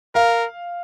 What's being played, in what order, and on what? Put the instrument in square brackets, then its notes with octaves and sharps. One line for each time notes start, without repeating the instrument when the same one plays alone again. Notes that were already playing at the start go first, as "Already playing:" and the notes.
[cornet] A#4 [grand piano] F5